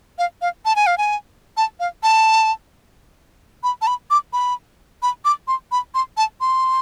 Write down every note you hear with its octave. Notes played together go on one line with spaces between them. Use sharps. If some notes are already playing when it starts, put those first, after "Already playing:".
F5
F5
A5
G#5
F5
G#5
A5
F5
A5
B5
A5
B5
D6
B5
B5
D6
C6
B5
C6
A5
C6